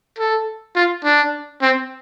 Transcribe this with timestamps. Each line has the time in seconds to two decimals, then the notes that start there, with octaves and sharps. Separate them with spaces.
0.19 A4
0.75 F4
1.04 D4
1.62 C4